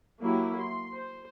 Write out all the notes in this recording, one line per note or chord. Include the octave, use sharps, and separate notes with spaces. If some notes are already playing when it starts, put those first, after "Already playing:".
F#3 A#3 E4 G4
C6
C5